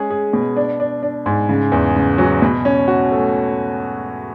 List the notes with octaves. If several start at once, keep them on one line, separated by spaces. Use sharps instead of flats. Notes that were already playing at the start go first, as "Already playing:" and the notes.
Already playing: G#3 C#4 G#4
G#4
B2
D4
D4
D4
G#2
C#3
E2
C#3
F#3
B2
C#4
F#4
A3